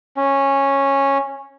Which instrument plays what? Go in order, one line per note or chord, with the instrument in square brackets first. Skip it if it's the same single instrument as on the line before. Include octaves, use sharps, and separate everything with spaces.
[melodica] C#4